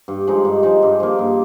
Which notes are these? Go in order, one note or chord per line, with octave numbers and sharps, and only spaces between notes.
G2
F3 G#3 D#4
G2
F3 G#3 D#4
G2
F3 A#3
G2